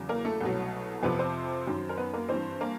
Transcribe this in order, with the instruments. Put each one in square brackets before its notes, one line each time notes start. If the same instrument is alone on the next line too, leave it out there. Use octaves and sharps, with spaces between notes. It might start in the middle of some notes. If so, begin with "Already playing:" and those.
Already playing: [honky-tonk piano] E2 C#3 F#3
A#3 A#4
A3 A4
C2 B2 F#3
F2 C3 F3 B3 B4
C4 C5
F#2 D#3 F#3
A#4
B3 B4
A#3 A#4
G2 E3 C4 C5
A#3 A#4